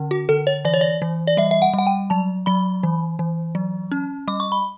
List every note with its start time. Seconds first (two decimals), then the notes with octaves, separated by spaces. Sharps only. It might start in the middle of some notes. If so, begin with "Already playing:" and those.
Already playing: D3 C#4
0.11 F#4
0.29 D3 A4
0.47 C#5
0.65 E3 D5
0.74 C#5
0.81 D5
1.02 E3
1.27 D5
1.37 G3 E5
1.51 E5
1.62 F#5
1.74 G3 F#5
1.87 G5
2.10 F#3 A5
2.46 F#3 B5
2.83 E3
3.19 E3
3.55 F#3
3.92 C#4
4.28 G3 D6
4.40 C#6
4.52 B5